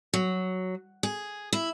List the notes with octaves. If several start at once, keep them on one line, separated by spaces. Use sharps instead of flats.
F#3
G#4
E4